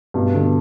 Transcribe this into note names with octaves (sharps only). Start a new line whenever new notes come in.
G2 B2
B2 D3